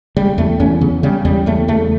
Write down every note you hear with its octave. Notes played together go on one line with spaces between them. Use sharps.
C#3 G3
E2 A3
E2 C#4
C#3 B3
C#3 G3
E2 G3
E2 A3
C#3 A3